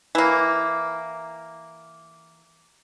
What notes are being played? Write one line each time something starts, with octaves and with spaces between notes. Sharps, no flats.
E3 A#3